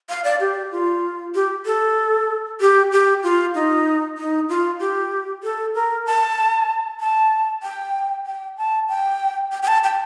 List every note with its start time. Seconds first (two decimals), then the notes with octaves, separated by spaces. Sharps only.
0.09 F5
0.24 D5
0.40 G4
0.72 F4
1.35 G4
1.66 A4
2.61 G4
2.92 G4
3.23 F4
3.55 D#4
4.18 D#4
4.49 F4
4.80 G4
5.43 A4
5.75 A#4
6.06 A5
7.00 A5
7.63 G5
8.26 G5
8.57 A5
8.89 G5
9.52 G5
9.63 G5
9.68 A5
9.84 G5